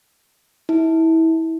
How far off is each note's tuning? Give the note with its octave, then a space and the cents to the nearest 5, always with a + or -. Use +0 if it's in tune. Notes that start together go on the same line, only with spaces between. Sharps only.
E4 -25